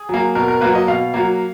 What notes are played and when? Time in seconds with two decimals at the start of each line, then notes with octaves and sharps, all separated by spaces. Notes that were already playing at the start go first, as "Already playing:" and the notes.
Already playing: G#4
0.09 F#3 A#3
0.35 B2 A#4
0.48 A#4
0.61 F#3 A#3 B4
0.75 D#5
0.87 B2 F5
1.14 F#3 A#3